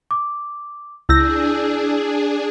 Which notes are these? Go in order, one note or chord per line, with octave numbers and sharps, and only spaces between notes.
D6
C#2 D4 E4 G#4 E6 G6 A#6